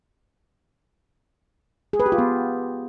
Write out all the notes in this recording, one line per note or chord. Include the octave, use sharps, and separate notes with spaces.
G#4
B4
G4
F4
B3